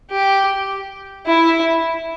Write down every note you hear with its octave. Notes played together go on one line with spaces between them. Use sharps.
G4
E4